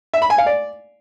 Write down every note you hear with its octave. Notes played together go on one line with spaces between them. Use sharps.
E5
B5
G#5
F5
D5